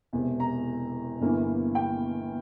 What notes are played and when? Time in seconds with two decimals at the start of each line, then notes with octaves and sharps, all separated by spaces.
0.13 E1 E2 C3
0.40 A#5
1.21 G1 G2 E3 A#3 C#4
1.75 G5